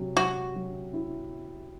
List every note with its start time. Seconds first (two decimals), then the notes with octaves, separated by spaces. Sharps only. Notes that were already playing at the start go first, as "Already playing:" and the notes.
Already playing: C3 F#3
0.17 F#3 F#4
0.55 F#3
0.93 E4